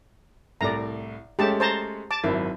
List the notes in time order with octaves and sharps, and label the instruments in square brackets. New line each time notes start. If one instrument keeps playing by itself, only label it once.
[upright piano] C2 A2 [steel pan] D5 A#5
[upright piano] G#3 A3 C#4 [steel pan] G4 A5
[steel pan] C5 A5 A#5
A5 D6
[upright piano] G#1 F#2 [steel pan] E4